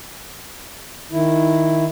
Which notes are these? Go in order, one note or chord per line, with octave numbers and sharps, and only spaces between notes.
D#3 E4